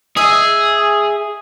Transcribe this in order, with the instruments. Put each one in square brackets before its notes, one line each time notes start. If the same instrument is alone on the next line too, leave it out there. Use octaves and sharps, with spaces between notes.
[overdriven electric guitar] G#4 [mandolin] D#5 E5